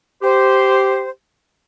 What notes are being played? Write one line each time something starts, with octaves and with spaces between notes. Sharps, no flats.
G4 C5